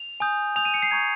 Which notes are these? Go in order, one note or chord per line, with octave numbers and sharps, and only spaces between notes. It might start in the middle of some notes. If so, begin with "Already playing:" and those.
Already playing: F7
G#5 D#6 G6
G#5 D#6 G6 F7
D#7
C#7
C7
A#5 C#6 G6 G#6